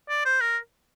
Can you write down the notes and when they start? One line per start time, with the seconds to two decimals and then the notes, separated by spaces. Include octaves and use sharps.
0.09 D5
0.25 C5
0.41 A#4